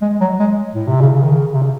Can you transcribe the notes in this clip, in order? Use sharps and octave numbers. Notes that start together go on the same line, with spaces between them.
G#3
F#3
G#3
A2
C3
C#3
C#3
D#3
C#3
C3
C#3